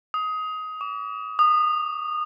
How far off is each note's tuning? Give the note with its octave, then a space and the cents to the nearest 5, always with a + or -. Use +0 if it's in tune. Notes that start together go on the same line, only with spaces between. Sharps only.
D#6 +20
D6 -40
D#6 -25